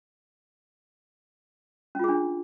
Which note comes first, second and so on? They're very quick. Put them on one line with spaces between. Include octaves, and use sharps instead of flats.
C#4 F4 G#4 D4